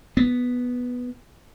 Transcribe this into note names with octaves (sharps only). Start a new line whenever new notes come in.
B3